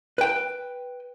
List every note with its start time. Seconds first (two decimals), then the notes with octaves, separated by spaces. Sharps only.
0.18 B4 G5